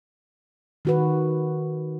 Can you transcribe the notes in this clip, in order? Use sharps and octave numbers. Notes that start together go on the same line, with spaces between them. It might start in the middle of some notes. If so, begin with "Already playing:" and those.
D#3 F#4 B4